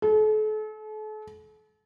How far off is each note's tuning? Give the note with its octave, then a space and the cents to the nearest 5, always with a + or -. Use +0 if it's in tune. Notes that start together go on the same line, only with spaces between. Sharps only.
A4 -40